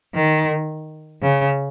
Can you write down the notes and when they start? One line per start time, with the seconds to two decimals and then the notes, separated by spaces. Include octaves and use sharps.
0.15 D#3
1.22 C#3